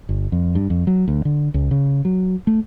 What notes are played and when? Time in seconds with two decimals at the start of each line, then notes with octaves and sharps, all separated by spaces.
0.09 G1
0.32 F2
0.55 G2
0.70 F2
0.87 F#3
1.08 D2
1.25 D3
1.54 C#2
1.71 C#3
2.05 F#3
2.47 A3